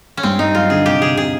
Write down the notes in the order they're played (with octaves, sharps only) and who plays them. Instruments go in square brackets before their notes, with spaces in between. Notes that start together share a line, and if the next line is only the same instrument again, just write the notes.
[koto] C#4
[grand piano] G2 [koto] C4
[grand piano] G2 [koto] D#4
[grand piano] F#3 [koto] F4
[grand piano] D3 [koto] G#4
[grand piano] C3 [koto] G4
[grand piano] C3 [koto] G#4
[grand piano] C3 [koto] G#4